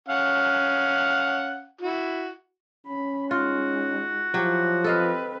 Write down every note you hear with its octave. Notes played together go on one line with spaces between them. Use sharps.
C#4 F5 F#5
E4 F#4
C#4 B5
G#3 D#4 F4 F#4
F3 F#3 E4 G4
C4 A4 B4 D#5 F5